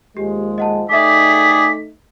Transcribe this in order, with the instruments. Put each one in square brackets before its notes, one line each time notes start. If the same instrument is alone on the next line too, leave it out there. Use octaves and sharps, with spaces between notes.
[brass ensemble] D#2 F3 G#3 [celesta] G4
[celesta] D#5 F#5 A5
[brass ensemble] A3 D#4 [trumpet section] G4 G#4 D5 [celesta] E5 D6 [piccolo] B6